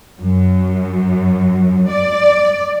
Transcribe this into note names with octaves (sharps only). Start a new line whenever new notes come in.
F#2
D5